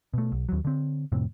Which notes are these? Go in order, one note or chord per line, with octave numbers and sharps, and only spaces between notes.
B2 A3
B1
D#2 F#3
D3 C4
F2 A2 C3